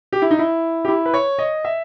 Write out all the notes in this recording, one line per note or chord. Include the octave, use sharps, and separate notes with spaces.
G4
E4
D#4
E4
G4
E4
B4
C#5
D#5
E5